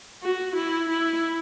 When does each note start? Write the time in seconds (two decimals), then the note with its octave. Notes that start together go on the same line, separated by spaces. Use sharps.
0.23 F#4
0.56 E4
0.90 E4